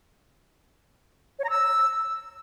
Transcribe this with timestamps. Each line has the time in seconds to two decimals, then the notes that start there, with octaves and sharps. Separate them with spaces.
1.39 C#5
1.44 A#5
1.50 E6